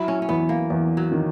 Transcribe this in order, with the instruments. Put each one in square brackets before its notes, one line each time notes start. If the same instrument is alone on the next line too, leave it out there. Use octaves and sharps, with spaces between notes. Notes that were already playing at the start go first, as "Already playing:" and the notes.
Already playing: [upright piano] F#3 [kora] E4
[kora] C#4
C#4
[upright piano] E2 [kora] B3
[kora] A#3
[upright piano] E2
[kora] F#3
[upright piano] D#3